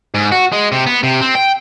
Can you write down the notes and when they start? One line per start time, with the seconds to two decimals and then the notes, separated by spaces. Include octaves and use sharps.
0.15 G#2
0.32 F#4
0.52 G#3
0.72 C3
0.87 B3
1.03 C3
1.21 C4
1.35 G5